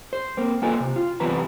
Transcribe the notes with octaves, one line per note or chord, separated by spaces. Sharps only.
C5
A#3 C4
A#3 F4 A4 B4 G#5
C3
F4
F#2 C3 E3 B3 B4 A#5